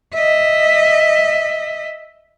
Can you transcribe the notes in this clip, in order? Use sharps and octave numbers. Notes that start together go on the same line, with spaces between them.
D#5 E5